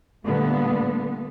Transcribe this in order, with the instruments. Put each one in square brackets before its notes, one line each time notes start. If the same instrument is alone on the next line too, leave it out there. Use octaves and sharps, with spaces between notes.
[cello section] A#2 D3 G3 A3 B3